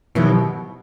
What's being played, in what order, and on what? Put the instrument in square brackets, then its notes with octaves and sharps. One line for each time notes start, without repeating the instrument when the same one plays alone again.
[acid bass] B2 [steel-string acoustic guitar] D#3 F#3 C4 E4 G4